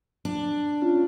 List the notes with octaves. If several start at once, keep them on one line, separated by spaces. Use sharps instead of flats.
D4
C#4 F4